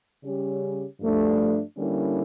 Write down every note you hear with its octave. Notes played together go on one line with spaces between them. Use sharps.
C#3 G3 C#4 G4
G2 F3 A3 D4
D3 G3 A#3 C#4 E4